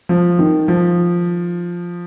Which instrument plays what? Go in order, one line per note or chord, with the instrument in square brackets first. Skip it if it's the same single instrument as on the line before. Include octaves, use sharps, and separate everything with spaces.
[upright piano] F3
D#3
F3